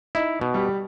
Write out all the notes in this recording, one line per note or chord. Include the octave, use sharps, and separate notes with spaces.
D#4 E4
B2
G3 G4